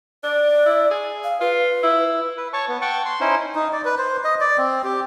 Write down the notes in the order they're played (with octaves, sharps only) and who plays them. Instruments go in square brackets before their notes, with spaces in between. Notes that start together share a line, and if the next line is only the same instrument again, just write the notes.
[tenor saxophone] D4 [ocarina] D5
[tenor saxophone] E4
G#4
[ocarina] F5
[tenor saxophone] F4 [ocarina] B4
[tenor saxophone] E4
[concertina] B4
C#5 A5 C#6
B3
F#5 G5 A5 C#6
C6
C#4 D#4 E4 C5
[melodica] D#4
D5
B4
C5
D#5
D5
C4
G4